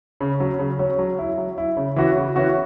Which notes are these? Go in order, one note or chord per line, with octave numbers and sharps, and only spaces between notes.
C#3
F#3 C#4
C#3
F#3 C#4
F#3
E4
F#3
E4
C#3
E3 C#4 F#4
C#3
E3 C#4 F#4